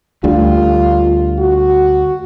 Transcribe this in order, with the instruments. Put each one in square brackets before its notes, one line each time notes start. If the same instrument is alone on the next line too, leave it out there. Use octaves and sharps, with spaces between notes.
[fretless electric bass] D2 D3 G3 [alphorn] F4
[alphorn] F#4